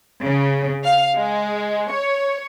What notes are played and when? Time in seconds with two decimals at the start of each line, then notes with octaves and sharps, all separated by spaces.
0.23 C#3
0.84 F5
1.16 G#3
1.90 C#5